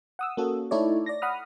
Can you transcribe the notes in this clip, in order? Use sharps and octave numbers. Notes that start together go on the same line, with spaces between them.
F#5 D#6 E6
A#3 C#4 F#4 A4
A3 D#4 E4 A4 C#5 D5
D5 A#6
F#5 B5 D#6 F6